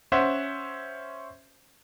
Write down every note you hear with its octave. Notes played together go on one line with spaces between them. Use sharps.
C#4 C5 E5 F#5